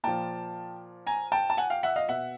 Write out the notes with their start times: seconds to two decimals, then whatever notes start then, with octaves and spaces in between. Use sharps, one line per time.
0.04 A#2 F3 G5 A5
1.07 G#5 A#5
1.32 G5 A5
1.50 A5
1.57 F#5 G#5
1.70 F5 G5
1.83 E5 F#5
1.96 D#5 F5
2.08 B2 E5 F#5